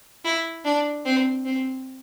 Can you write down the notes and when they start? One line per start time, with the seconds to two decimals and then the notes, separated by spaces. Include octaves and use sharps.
0.24 E4
0.64 D4
1.05 C4
1.45 C4